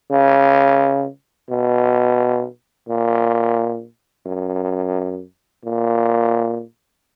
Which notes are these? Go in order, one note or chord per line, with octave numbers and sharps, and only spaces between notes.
C#3
B2
A#2
F#2
A#2